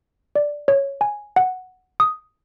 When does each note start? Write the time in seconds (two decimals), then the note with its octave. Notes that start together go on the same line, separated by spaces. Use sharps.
0.36 D5
0.68 C#5
1.01 G#5
1.36 F#5
2.00 D#6